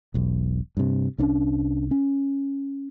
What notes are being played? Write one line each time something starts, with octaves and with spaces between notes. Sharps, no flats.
E1 B1
G2 C3
C2 C#4 D4
C#4